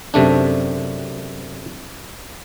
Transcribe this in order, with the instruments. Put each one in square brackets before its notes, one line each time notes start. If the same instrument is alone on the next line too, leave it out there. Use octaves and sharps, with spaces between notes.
[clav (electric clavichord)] F#2 C3 A3 D4